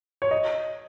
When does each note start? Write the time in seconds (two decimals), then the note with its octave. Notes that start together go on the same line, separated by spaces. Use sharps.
0.22 C#5
0.31 D#5